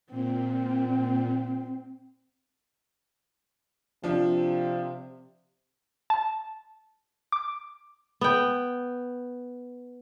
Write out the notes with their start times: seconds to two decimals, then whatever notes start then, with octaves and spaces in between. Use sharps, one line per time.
0.11 A#2 C4
4.04 C3 F3 D4
6.10 A5
7.32 D6
8.21 B3 G5